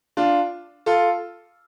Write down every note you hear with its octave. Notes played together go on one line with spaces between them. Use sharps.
D4 F4
F4 A4